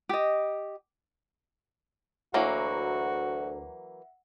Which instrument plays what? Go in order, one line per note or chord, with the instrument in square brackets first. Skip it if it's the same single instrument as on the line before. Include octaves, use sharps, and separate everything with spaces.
[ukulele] G4 D#5
[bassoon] D2 [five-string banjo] E3 F#3 A#3 [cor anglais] F#4 [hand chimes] E5 F#5